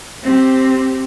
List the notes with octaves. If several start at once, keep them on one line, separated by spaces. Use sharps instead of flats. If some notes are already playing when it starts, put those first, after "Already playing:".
C4 G4